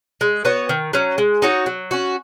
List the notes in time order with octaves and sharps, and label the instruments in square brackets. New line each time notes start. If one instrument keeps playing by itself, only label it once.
[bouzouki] G#3
B3 F#4 C#5
D#3
F#3 C#4
G#3
D#4 F#4 C#5
F#3
C#4 F#4